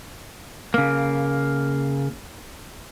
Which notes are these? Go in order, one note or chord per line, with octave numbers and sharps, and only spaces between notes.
C#3 A#3